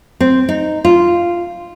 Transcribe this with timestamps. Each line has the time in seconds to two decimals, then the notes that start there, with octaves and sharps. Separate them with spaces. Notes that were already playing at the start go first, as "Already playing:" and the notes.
0.20 C4
0.49 D#4
0.85 F4